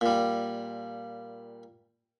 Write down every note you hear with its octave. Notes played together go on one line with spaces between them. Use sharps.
A#2 G3